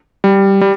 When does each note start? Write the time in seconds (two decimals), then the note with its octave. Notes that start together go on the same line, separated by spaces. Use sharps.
0.24 G3
0.61 G3